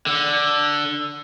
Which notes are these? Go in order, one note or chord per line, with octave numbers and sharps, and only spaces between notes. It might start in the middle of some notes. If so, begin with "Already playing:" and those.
D3